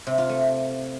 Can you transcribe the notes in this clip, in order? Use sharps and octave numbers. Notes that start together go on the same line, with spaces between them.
C3
F4
A3